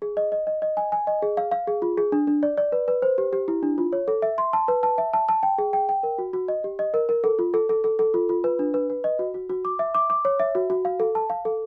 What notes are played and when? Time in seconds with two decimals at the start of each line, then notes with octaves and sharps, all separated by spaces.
0.02 G#4
0.17 D#5
0.32 D#5
0.47 D#5
0.62 D#5
0.77 G#5
0.92 G#5
1.07 D#5
1.22 G#4
1.37 F5
1.52 F5
1.67 G#4
1.82 F4
1.98 G#4
2.12 D4
2.27 D4
2.43 D5
2.57 D5
2.72 B4
2.88 B4
3.02 C5
3.18 G4
3.33 G4
3.48 E4
3.63 D4
3.78 F4
3.93 C#5
4.08 A4
4.22 E5
4.38 C6
4.53 A5
4.68 B4
4.83 A5
4.98 E5
5.13 A5
5.29 A5
5.43 G5
5.58 G#4
5.73 G5
5.89 G5
6.03 A#4
6.18 F#4
6.33 F#4
6.48 D#5
6.64 G4
6.79 D#5
6.94 A#4
7.09 A#4
7.24 A4
7.39 F4
7.54 A4
7.69 A4
7.84 A4
7.99 A4
8.14 F4
8.29 F4
8.44 B4
8.59 D4
8.74 B4
8.90 B4
9.04 D#5
9.19 F#4
9.34 F#4
9.49 F#4
9.65 D6
9.79 E5
9.95 D6
10.10 D6
10.25 C#5
10.40 E5
10.55 F#4
10.70 F#4
10.85 F5
11.00 A4
11.15 A5
11.30 F5
11.45 A4